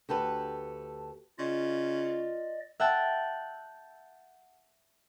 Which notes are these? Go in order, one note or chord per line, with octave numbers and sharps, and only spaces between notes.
D2 G4 A4 B4
C#3 F4 D5 D#5
E5 F#5 G5 A5